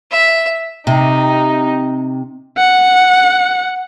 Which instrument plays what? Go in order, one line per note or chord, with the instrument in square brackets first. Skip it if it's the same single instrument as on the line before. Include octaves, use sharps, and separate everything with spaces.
[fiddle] E5
[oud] C3 [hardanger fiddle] D#4
[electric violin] F#5